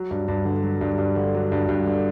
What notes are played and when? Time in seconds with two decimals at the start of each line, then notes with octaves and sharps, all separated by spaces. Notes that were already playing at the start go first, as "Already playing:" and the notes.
Already playing: F#3
0.11 G2
0.28 G2
0.45 D3
0.63 F#3
0.81 G2
0.98 G2
1.16 D3
1.35 F#3
1.52 G2
1.69 G2
1.87 D3